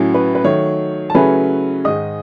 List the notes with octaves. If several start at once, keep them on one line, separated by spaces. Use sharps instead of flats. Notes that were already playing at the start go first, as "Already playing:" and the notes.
Already playing: A2 F#3 C#4 E4
B4
B4
D#3 F#3 A3 C#5
A5
C#3 F#3 A3 C#4 E4 B4 B5
G#2 D#3 G#3 D#5 D#6